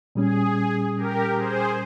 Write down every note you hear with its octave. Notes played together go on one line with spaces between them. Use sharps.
A#2 G3 C#4 G#4
G4 A#4
G#4 C5